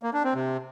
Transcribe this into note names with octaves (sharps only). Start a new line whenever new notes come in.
A#3
D4
C4
C3